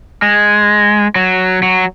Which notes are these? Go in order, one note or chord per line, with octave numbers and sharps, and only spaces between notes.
G#3
F#3
F#3